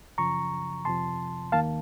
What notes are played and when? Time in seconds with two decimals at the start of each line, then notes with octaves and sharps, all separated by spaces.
0.18 F#2 C#3 F3 A#5 C#6
0.85 F2 C3 F3 A5 C6
1.52 D#2 D#3 A#3 F5 A5